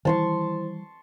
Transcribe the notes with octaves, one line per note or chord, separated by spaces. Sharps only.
D#3 E3 G3 E4 C5 A5 C6 C#6